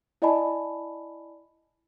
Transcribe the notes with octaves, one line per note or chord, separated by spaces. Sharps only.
E4 D5 D#5 G#5 A5 B5